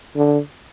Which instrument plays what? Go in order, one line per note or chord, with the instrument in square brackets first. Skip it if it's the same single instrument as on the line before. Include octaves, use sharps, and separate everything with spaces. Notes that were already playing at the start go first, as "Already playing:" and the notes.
[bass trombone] D3